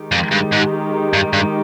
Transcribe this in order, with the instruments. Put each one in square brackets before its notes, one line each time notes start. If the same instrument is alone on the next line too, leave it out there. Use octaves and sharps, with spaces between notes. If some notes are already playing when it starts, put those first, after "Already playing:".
Already playing: [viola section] D#3 G#3 D#4 G4
[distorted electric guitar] F2
G2
G#2
G2
G2